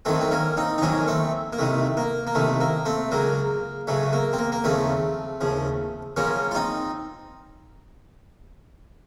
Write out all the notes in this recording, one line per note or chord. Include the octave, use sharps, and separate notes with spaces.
F2 D#3 F#3 A3 C4
C4
A#3 C#4
C4 D#4
D#4
F2 D#3 F#3 A#3 C#4
A3 C4
A#3
C2 C3 D#3 A3
A#3
A#3
C2 C3 D#3 A3
A#3
A3 C4
C#2 C#3 F#3 A#3
C#2 C#3 F#3 A3
A#3
C4
A#3
A#3
D#2 C#3 F3 A3 C4
D#2 C#3 F3
F#2 C#3 F3 A#3 C#4
F4
C4 D#4